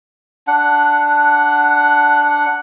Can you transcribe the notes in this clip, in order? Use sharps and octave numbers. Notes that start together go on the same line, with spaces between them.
D4 F#5